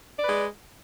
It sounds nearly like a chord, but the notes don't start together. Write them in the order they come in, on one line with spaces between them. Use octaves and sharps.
D5 B4 G#3